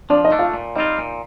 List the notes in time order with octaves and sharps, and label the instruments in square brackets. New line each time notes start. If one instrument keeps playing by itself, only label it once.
[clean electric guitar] F3 [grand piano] D4 D5
[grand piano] D#4 D#5
[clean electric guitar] A3 D4
[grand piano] F4 F5
[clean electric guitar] A#2
[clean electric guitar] G3 C4 F4 [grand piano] D#4 D#5
[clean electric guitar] A#2